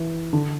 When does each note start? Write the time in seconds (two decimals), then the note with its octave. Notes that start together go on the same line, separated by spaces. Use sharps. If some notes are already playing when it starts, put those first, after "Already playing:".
Already playing: E3
0.33 D3